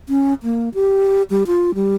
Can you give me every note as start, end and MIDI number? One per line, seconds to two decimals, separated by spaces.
0.09 0.34 61
0.43 0.69 58
0.74 1.22 67
1.30 1.43 55
1.47 1.75 65
1.75 1.95 55